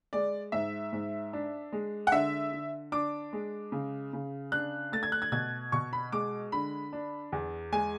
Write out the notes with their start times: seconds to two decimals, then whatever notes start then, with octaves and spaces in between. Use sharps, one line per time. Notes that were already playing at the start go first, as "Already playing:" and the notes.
0.13 G#3 D5
0.52 G#2 E5
0.93 G#2
1.33 D4
1.72 G#3
2.07 F#5
2.12 D3 E5
2.52 D3
2.92 D4 D6
3.33 G#3
3.72 C#3
4.13 C#3
4.52 D4 F#6
4.92 A3 A6
5.03 G#6
5.12 F#6
5.22 G#6
5.32 B2 G#6
5.72 B2 C#6
5.93 B5
6.12 G#3 D6
6.52 D3 B5
6.93 D4
7.32 E2
7.72 G#3 G#5